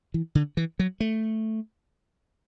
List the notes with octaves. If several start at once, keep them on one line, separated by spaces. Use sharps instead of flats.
E3
D3
E3
F#3
A3